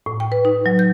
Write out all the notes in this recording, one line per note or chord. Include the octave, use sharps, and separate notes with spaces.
A2
G5
B4
D#4
F#3
G6